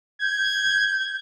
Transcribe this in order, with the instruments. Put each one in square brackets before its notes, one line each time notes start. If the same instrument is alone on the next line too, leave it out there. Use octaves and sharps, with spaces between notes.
[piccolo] G6 [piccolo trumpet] G#6